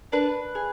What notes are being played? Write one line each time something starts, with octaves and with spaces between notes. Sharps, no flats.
D4 B4
G#4